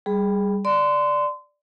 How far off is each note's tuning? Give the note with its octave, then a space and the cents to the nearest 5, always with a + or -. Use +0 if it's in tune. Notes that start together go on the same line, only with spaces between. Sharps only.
G3 +0 G#4 +0 B5 +0
D5 +0 C6 -25